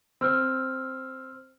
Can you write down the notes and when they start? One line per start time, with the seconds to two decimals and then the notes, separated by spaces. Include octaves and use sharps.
0.21 C4 E6 F6